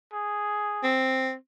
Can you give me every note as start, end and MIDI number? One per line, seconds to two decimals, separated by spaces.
0.13 0.93 68
0.83 1.34 60